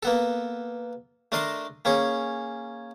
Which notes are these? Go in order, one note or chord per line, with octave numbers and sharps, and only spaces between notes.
A#3 B3 A4
A3 D4 A#4 D#5 A5 C6
A#3 C#4 G#4 C#5